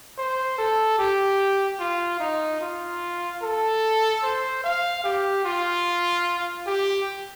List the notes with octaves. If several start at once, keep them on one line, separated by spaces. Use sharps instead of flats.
C5
A4
G4
F4
D#4
F4
A4
C5
F5
G4
F4
G4